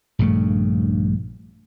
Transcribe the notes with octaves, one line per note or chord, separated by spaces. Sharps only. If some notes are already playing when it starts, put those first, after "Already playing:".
A#1 G2 C#3 A3